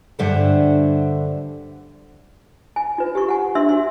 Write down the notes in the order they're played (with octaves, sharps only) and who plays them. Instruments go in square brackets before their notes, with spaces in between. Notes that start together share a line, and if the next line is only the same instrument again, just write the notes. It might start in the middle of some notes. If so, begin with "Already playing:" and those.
[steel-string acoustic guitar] G2 D3 C5 E5 F#5 A5
[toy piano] G#5
F4 B4
G4 C#6
F#5 G#5
D4 E5 C6 E6
F#4 C6